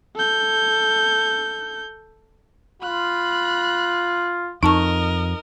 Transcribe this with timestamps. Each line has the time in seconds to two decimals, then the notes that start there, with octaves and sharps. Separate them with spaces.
0.16 A4 G6
2.82 F4 B5 F#6
4.63 F2 D#4 A#4 D#5 A5 C#6